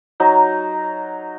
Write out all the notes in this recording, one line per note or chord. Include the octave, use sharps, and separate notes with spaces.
F#3 D#4